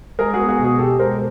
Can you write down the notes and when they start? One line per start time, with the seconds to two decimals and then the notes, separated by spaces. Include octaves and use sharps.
0.19 G#3 G#4 A#4
0.34 F#4 G#4
0.39 B3
0.49 F#4 G#4
0.59 B2
0.64 F#4 G#4
0.78 B2 G4 A4
0.99 G#3 A#4 C5